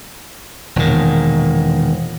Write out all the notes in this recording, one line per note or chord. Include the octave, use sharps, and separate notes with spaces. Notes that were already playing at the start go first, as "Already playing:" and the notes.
E1 A#2 D#3